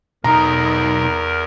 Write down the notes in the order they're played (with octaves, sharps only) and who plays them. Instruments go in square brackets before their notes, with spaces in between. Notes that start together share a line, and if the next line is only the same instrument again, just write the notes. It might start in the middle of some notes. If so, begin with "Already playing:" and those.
[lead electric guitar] B1 D#4 [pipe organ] E2 A#4 [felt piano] A#5